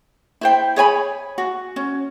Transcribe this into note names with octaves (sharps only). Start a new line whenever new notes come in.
E4 C5 G5
G#4 C#5 G#5 B5
F#4
C#4